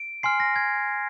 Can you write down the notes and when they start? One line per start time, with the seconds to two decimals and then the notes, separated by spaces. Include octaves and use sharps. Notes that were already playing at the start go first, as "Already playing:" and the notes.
Already playing: D7
0.23 G#5 C6 F6 C7
0.40 A#6
0.56 G#6